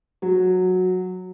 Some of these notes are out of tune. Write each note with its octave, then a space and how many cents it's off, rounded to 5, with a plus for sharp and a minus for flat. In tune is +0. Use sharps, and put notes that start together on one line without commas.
F#3 -10